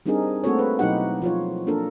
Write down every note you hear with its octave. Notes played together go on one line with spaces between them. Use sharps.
G3 C4 D4 D#4 G#4 A#4
A3 A#3 C4 F#4 A4 C#5
B4
B2 F#3 D#4 E4 G4 F#5
F3 F4 C#5
A#3 D4 A4 A#4